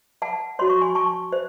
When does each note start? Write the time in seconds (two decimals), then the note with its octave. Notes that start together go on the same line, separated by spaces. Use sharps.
0.22 F#5 A5
0.59 F#4 C#5 C6
0.70 C#6
0.81 G#5 C6
0.95 A5 C#6
1.32 C5